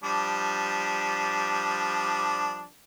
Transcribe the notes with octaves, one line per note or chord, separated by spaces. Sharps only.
F3 G3 D4